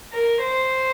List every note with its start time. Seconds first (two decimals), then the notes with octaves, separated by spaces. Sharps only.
0.13 A#4
0.43 C5